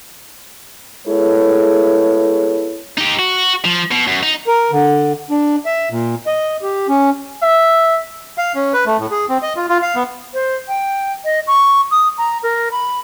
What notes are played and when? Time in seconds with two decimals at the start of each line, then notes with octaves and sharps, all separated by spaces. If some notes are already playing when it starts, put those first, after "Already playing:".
1.07 G#3 B3 E4 G#4 A4 C#5
2.98 D#4 G4
3.19 F#4
3.65 F3
3.91 B2
4.07 F#2
4.23 D#4
4.47 A#4
4.71 D3
5.31 D4
5.66 E5
5.91 A#2
6.27 D#5
6.62 G4
6.89 C#4
7.43 E5
8.38 F5
8.55 C#4
8.73 B4
8.86 A3
8.99 A2
9.11 G#4
9.29 C4
9.42 D#5
9.56 F4
9.69 F4
9.82 F5
9.96 B3
10.34 C5
10.68 G5
11.25 D#5
11.47 C#6
11.91 D#6
12.18 A#5
12.43 A#4
12.72 B5